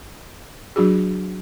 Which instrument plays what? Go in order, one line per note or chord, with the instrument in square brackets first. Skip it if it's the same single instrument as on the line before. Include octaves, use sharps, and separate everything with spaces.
[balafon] F#3 D4 F#4 G#4